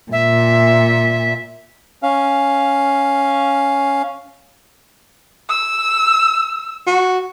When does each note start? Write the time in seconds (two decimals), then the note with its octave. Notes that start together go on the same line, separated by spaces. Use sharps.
0.12 A#2 E5
2.03 C#4 F5
5.49 E6
6.87 F#4